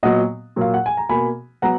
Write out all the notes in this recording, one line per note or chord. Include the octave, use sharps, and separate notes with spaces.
A#2 F#3 B3 D#5 F#5
A#2 F#3 A#3 F5
F#5
G#5
A#5
B2 A#3 G#5 B5
F#3 B3 F#5 A#5